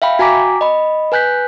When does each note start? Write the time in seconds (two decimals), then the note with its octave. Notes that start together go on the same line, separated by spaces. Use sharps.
0.02 E5 F5 G5 B5
0.19 F#4 G5 G#5 A#5 D6 B6
0.61 D#5 B5
1.12 B4 G#5 F#6 G6 B6